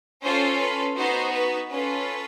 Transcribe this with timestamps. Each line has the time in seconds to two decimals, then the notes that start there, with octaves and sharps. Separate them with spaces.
0.23 C#4 F4 A4 C5
0.60 B4
0.96 B3 D#4 F#4 C5
1.34 B4
1.70 C#4 F4 A4 B4